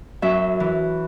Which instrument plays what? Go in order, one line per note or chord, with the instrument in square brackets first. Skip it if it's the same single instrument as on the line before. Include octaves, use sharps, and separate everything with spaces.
[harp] F#2 E5
E3